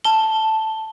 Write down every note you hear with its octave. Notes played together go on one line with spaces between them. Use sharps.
A5 G7